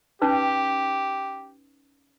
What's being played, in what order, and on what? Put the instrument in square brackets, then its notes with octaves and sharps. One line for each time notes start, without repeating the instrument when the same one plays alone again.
[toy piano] C#4 D#4 B4 [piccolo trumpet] G4